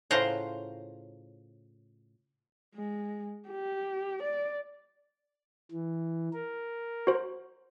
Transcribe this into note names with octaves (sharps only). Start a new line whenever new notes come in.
A2 C#3 F4 C5 F#5 A#5
G#3
G4
D5
E3
A#4
F#4 C5